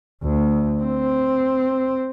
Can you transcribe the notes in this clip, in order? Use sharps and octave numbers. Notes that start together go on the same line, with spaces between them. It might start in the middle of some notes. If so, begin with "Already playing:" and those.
D2
C4